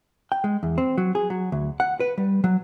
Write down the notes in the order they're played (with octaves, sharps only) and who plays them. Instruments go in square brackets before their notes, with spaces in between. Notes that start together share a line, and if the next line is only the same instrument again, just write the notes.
[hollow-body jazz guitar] G5
G#3
E2
C4
F#3
G#4
F#3
D2
F#5
B4
G3
F#3